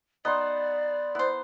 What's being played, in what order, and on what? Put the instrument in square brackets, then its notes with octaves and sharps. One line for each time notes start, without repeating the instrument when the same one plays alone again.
[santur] B3 D#4 C5 [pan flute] D5 [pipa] D#5
[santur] B3 [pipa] E4 C5